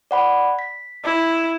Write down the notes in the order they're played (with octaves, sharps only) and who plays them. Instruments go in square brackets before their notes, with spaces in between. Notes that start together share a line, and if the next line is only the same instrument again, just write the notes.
[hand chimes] D5 F#5 B5
B6
[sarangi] E4